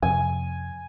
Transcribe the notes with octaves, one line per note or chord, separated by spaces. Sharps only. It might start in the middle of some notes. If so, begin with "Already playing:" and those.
F2 C3 G#5